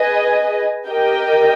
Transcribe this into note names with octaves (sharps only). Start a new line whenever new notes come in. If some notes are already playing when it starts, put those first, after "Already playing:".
Already playing: G#4 B4 D#5
G4 A#4 D#5 G5